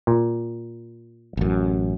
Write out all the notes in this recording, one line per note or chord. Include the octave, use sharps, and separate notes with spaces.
A#2
A1 F#2